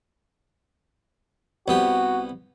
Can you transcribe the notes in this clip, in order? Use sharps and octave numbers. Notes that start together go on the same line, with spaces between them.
C2 B3 F#4 G4